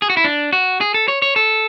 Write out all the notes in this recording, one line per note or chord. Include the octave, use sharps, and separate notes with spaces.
G#4
F#4
E4
D4
F#4
G#4
A4
C#5
C#5
A4